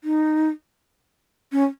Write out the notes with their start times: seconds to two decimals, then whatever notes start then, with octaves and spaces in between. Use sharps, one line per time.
0.04 D#4
1.52 C#4